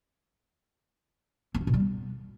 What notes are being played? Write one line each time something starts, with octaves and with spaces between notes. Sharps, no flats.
C4
C#4
B2
G3
B3